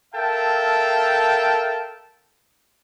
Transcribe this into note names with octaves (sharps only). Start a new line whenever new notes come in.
A4 A#4 E5 F5 G5 A5